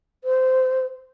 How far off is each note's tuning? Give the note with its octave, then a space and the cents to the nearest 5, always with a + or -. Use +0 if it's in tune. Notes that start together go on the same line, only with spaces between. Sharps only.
C5 -20